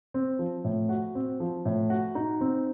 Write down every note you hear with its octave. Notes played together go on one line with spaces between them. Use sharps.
C4
F3
A2
F#4
C4
F3
A2
F#4
D#4
C4